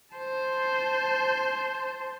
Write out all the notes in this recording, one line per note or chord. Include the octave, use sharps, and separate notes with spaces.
C5 A5